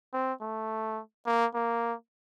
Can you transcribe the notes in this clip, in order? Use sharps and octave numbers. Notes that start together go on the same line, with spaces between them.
C4
A3
A#3
A#3